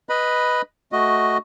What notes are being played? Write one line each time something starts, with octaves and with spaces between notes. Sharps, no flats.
B4 D#5 B5
A3 F#4 D#5